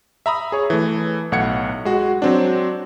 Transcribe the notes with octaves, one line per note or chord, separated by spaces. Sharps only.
E5 A#5 B5 D#6
G#4 C#5
E3 A3
B1 A2 F#5 G#6 C#7
G#3 F#4
F#3 C4 D4